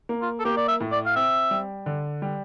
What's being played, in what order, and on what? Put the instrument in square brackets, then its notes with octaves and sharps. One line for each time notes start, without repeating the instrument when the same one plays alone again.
[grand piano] A#3
[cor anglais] F4
A4
[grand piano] A#3 [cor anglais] G4
[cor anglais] D5
E5
[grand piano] A2
[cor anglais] D5
F5
[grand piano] C4 [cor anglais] E5
[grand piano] G3
D3
G3